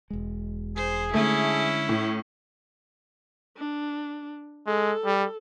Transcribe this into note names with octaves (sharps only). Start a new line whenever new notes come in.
E1 G#3
G#4 C5
D3 G#3 A3 C#4 E4
A2
D4
G#3 A4
G3